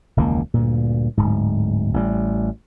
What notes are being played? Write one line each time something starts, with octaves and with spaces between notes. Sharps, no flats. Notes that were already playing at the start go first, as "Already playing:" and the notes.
E1 C#2 D#3 A#3
D2 G2 A#2
D1 G#2
A1 G3